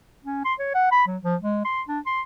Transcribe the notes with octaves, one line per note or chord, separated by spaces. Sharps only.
C#4
C6
C#5
F#5
B5
F#3
F3
G#3
C6
D4
C6